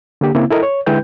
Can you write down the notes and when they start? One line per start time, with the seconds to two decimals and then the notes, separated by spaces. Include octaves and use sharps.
0.21 D3 A#3 G4
0.35 C#3 A#3 C4 E4
0.50 E4 A4 A#4 D#5
0.63 C#5
0.86 D3 G#3 E4 B4 G5 G6